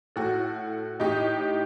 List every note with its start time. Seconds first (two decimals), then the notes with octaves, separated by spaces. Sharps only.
0.16 A2 F#4 A4
1.00 A2 D#4 G4